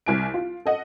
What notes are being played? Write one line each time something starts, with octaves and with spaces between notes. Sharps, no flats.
C2 G#5 D7
F4
A4 D#5 F#5